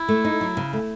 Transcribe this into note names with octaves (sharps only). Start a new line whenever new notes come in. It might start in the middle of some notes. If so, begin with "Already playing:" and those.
Already playing: E4
A3
D#4
F#3
C#3
A3